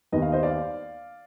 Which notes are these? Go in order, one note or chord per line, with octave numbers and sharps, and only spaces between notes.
D#2 D#3 B3 D#5
F5
C5 D#5
D5 F5